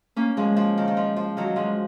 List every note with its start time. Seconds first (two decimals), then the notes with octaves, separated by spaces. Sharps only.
0.16 A#3 C#4
0.37 F3 G#3
0.56 F3
0.77 D#3
0.88 D#3
0.97 F3
1.16 F3
1.37 D#3 F#3
1.56 F3 G#3